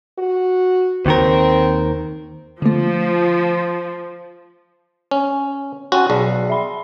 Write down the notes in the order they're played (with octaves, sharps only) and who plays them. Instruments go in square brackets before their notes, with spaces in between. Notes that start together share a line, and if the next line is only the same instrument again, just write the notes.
[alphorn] F#4
[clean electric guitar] D#2 D#3 A#4 [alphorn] C4
[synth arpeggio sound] D3 A3 [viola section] F3
[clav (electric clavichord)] C#4
[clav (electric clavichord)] C#4 F#4 [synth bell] C#5 G5 C6
[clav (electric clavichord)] B1 [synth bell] G#4 D5
[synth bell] E5 B5 C6